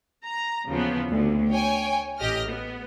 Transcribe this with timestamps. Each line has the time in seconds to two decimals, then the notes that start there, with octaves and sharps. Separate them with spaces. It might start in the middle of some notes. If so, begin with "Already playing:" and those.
0.25 A#5
0.67 D#2 C#3 E3 F3 B3
1.09 D2
1.52 C#5 G5 G#5
2.19 A1 G4 D#5 F6
2.49 B3